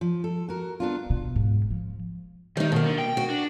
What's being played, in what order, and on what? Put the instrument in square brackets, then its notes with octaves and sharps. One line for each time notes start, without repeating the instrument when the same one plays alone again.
[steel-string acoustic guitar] F3
A4
F#4 A#4
B3 D4 F4
[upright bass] B2
G#2
F3
[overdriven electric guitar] D#3 [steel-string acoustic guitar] G3 D#4
[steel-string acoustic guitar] B2 A#3
[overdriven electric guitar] D3
G5
[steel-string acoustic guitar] F#4
[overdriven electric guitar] D4